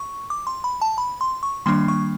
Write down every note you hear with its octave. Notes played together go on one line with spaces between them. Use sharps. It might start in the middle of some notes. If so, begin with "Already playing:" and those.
Already playing: C#6
D6
C6
B5
A5
B5
C6
C#6
D#3 G3 A#3 D4 C6
C#6